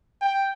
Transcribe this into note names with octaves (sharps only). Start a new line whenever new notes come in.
G5